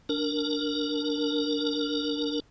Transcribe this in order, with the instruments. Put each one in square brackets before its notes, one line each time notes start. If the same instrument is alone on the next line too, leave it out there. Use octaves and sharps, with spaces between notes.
[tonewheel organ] D4 A#4